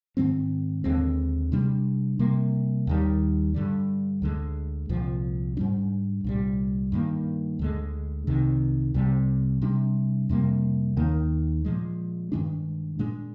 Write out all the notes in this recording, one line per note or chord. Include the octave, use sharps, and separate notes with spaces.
G#2 D#3 G#3 C4
D#2 D3 G#3 C4
C3 G3 D4
C3 G3 A#3
D#2 D#3 G3
G2 D3 G3
D2 D3 G#3
C2 A#2 F3
G#2 G3 D4
C2 A#2 G3
G2 D#3 A#3
D2 D3 G#3
C2 C3 D#3
C2 C3 G3
C3 G3 D4
F2 C3 G3 A#3
D#2 D#3 A#3
A#2 F3 G#3
G2 D#3 G#3 D4
A#2 G#3 D4